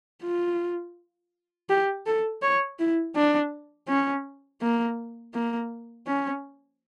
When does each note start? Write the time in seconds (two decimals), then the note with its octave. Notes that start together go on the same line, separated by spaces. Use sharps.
0.24 F4
1.70 G4
2.06 A4
2.42 C#5
2.79 E4
3.16 D4
3.88 C#4
4.61 A#3
5.34 A#3
6.07 C#4